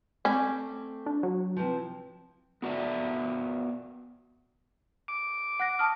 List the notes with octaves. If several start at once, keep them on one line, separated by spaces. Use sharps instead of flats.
A3 C4 C#4 D5
D4
F#3
C3 E3 F3
B3 F#4 D5 E5
D6
F#5 F#6 A#6
A5 D#6 F6